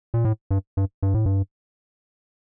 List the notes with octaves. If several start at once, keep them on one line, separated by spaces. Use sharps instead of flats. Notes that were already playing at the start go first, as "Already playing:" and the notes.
A#2
A2
G2
G2
G2
A2
G2